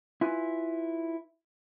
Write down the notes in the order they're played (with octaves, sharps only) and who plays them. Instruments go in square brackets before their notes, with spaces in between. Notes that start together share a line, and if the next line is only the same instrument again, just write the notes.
[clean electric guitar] E4 F4 B4 G#5